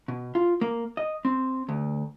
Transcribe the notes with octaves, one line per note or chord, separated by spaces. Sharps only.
B2
F4
A#3
D#5
C4
D2